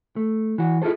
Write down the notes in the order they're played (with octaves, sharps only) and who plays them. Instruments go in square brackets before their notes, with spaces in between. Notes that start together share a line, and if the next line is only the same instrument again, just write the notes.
[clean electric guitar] A3
E3 F#4
E4 F4 G#4 A4 C5